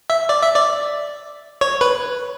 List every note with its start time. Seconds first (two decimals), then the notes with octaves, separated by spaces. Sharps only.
0.10 E5
0.29 D5
0.43 E5
0.55 D5
1.61 C#5
1.81 B4